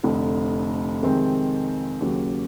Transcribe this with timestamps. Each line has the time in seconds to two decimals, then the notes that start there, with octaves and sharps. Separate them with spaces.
0.03 F1 F2 D3
1.02 F2 C3 D#3 G#3 C4
2.00 D#2 C#3 F#3